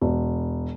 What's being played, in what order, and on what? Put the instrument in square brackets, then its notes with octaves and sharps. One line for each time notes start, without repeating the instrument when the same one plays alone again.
[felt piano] E1